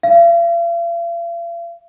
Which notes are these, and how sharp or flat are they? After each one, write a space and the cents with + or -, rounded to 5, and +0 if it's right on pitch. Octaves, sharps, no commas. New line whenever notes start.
F5 -45